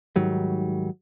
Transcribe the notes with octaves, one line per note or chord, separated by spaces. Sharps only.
G#2 D#3 F#3 G3